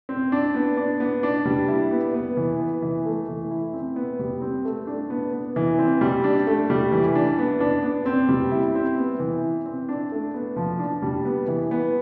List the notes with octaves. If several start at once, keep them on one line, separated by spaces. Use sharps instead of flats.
C4
D4
B3
D4
B3
D4
G3
E4
B3
B3
E3
B3
E3
A3
E3
E4
C4
B3
G3
C4
A3
D4
B3
B3
E3
C4
G3
D4
A3
G3
E3
D4
B3
D4
B3
C4
G3
E4
C4
B3
E3
E4
C4
D4
A3
B3
F3
D4
G3
B3
E3
B3